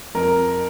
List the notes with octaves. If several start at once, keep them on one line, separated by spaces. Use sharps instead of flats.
F2 A#4